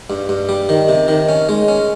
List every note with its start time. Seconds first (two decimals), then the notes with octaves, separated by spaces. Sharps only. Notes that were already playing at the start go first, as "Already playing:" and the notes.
0.10 G2
0.29 G2
0.49 G3
0.69 D#3
0.89 C3
1.08 D#3
1.29 C#4
1.49 G#3
1.68 C#4